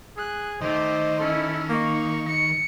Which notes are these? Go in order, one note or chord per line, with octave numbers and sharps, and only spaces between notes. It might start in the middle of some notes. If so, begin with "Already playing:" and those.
G#4 F#6
D#3 A3 C5 D#5 D6
C#4 E4 A4
A#3 D#4 C#6
D#4 C#7